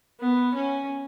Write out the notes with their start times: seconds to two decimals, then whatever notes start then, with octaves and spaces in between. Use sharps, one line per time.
0.20 B3
0.55 C#4